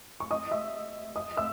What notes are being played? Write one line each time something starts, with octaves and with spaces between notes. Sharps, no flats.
C#6
D#5 D#6
E5 E6
D#5 D#6
E5 E6